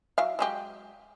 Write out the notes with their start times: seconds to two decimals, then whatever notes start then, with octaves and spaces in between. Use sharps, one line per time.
0.18 F#3 E4 F5
0.39 F#3 G#3 G4